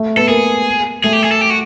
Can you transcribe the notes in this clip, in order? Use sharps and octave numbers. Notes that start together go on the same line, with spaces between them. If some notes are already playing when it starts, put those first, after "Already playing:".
Already playing: A3
B3 A4
A#3 G#4
A3 G#4
G4
G#4
A4
G4
F#4